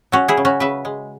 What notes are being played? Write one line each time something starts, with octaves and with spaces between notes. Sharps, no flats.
F#3 C#4 F#4
E4 G#4
C#3
C#4 F#4
C#3 B4 E5
G#3